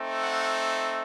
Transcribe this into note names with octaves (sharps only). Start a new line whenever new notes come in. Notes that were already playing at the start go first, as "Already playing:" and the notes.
Already playing: A3 C4 D#4
F#5